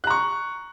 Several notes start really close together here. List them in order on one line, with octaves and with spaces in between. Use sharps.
F#6 A#5 C#6